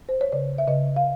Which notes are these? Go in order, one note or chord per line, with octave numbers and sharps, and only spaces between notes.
C5
C#5
C#3 D5
E5
C#3 D#5
F5